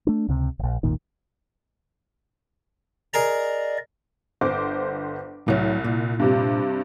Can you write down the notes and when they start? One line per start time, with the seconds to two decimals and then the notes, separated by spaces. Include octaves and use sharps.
0.07 A3 D4
0.28 C#2 C3
0.59 D#1 A#1
0.83 G#1 D#2 A#2 D#3
3.14 G#4 A#4 D5 D#5 A#5
4.41 G1 C5 D6
5.48 C2 A2 F#3
5.84 A#2
6.20 G2 C3 G3